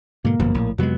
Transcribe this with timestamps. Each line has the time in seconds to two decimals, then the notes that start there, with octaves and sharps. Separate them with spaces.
0.24 G#2 B2 D3 A#3
0.40 G1 F#2 B2 F3
0.54 A#1 A2
0.78 F2 C3 F#3 G#3 B3